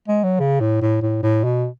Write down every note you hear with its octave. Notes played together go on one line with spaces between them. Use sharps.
G#3
F#3
C#3
A2
A2
A2
A2
B2